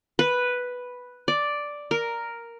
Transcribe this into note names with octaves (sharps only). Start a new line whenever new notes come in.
B4
D5
A#4